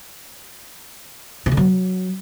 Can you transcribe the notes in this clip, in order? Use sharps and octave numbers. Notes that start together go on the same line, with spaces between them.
C3
D3
F#3